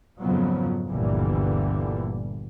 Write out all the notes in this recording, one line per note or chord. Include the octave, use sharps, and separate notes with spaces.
F2 G#2 C#3 F3 F#3 B3
G1 D2 A#2 D3 E3 G3